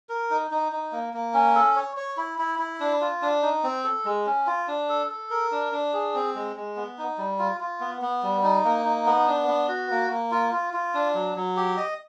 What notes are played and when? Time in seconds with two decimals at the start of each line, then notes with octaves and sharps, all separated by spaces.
0.09 A#4
0.30 D#4
0.51 D#4
0.72 D#4
0.92 A#3
1.14 A#3
1.34 C#4
1.55 A4
1.76 C#5
1.97 C#5
2.17 E4
2.39 E4
2.59 E4
2.80 D4
3.01 F4
3.22 D4
3.43 D#4
3.64 C4
3.84 A4
4.05 G#3
4.26 C#4
4.47 F4
4.68 D4
4.89 A4
5.10 A4
5.30 A#4
5.52 D4
5.72 D4
5.93 G#4
6.15 C4
6.35 G#3
6.56 G#3
6.77 B3
6.98 D#4
7.18 G3
7.39 F4
7.60 F4
7.81 B3
8.02 B3
8.23 G3
8.43 D#4
8.65 A#3
8.85 D#4
9.06 B3
9.27 D4
9.48 B3
9.68 F#4
9.90 A#3
10.10 A#3
10.32 F4
10.52 F4
10.74 F4
10.94 D4
11.15 F#3
11.36 F#3
11.57 G4
11.77 D#5